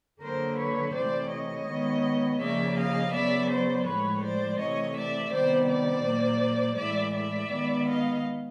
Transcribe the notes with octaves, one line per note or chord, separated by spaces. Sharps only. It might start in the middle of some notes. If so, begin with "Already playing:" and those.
D3 F#3 A#3 A#4 C5
B4 C#5
C3 E3 A3 C5 D5
C#5 D#5
D#3 G#3 B3
C#3 F3 A#3 D5 E5
D#5 F5
C#3 F#3 B3 D5 E5
C5 D5
A2 F3 G#3 B4 C#5
C5 D5
C3 E3 A3 C#5 D#5
D5 E5
C3 D#3 G3 B3 C5 D5
C5 D5
A#2 F#3 A#3
A2 E3 G#3 D5 E5
D5 E5
D#3 G#3 B3
D#5 F5